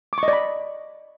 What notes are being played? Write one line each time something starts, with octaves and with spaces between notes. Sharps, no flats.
D6
C#6
D#5
D5
B5